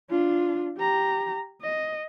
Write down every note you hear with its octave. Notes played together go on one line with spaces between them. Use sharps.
D4 F4
G4 A#5
D#5